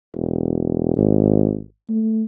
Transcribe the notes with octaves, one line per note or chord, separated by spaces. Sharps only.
E1
G#1
A3